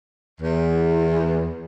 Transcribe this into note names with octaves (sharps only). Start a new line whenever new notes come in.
E2